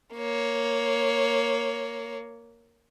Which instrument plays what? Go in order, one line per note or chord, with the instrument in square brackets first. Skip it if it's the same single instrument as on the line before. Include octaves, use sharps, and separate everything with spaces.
[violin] A#3 C#5